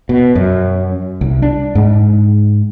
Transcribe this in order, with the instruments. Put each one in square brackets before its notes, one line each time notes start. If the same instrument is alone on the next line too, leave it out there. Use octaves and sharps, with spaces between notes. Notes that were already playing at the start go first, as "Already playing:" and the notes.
[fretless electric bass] B2
F#2
C2
D4
G#2